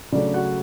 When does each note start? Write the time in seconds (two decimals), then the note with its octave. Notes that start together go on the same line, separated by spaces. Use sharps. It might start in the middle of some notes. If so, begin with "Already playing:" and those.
0.12 C#3 F#3 A3 D4 D5
0.34 F#4 F#5